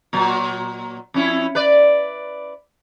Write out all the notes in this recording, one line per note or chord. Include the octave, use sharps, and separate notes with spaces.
A#2 F#3
F2 C#4 E4
B4 D5